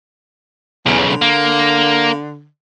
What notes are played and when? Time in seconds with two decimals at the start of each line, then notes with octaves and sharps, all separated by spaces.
0.86 B1 E2 C#3
1.10 D3
1.22 A#3